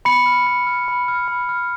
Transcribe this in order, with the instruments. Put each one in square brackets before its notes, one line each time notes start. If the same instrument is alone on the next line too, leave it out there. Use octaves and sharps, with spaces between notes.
[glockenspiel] B5 C#7
F6
B5
F6
B5
F6
B5
F6